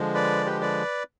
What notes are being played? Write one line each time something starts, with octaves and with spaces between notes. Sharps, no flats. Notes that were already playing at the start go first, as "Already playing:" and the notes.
Already playing: D3 F3 G#3
B4 D5
G4 B4
B4 D5